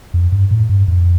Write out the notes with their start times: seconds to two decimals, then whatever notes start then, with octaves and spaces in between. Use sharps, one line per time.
0.14 F2
0.32 G2
0.51 A2
0.69 G2
0.88 F2